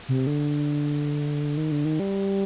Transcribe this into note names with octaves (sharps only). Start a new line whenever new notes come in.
C3
D3
D#3
D3
D#3
G3